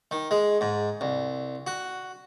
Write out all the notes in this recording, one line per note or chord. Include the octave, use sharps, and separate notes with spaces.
D#3
G#3
G#2
C2
F#4